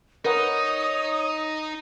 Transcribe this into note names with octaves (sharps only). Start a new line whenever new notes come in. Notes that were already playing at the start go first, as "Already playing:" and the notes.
D#4 A#4 B4 C#5 F#5 D#6